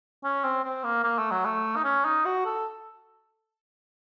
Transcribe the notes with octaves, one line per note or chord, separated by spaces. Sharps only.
C#4
C4
C4
A#3
A#3
A3
F#3
A3
D#4
C#4
D#4
F#4
A4